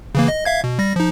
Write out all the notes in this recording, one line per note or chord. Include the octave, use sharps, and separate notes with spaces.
C#3 E3 A#3
D#5
E5 F5 G#6
B2
G3 A#6
F3 D#4